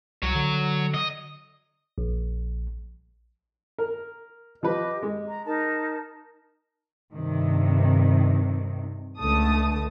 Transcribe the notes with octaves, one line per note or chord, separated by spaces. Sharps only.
C2 F#3 C#5
D3
D#5
A#1
A#4
F3 G4 B4 D#5
G#3
A#5
D#4 A#4 A5
G2 C3 D#3
C#2 D3 A3 A5 D#6